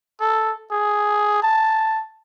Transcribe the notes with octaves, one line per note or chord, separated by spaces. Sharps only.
A4
G#4
A5